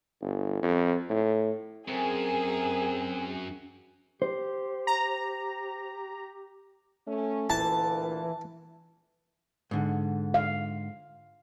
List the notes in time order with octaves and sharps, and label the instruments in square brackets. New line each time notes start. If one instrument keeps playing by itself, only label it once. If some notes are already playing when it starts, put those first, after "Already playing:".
[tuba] G1
F2
A2
[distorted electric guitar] F#2 [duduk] C4 [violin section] G#4 [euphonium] A#4
[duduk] G4 [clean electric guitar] C5
[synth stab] A#5
[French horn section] A3 C#4
[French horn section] D2 A#2 [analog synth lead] E3 [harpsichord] A5
[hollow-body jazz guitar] G#2 D3
[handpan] F5